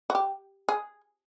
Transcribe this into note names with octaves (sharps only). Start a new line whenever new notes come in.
F#4
G4
G#4